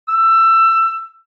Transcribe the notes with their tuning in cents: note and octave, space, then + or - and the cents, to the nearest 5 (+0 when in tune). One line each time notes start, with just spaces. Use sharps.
E6 +20